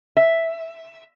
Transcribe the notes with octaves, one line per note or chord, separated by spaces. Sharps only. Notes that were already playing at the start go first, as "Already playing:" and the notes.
E5